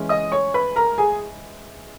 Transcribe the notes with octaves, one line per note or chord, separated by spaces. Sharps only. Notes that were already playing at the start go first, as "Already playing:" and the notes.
Already playing: E3 G#3 C#4
D#5 D#6
C#5 C#6
B4 B5
A#4 A#5
G#4 G#5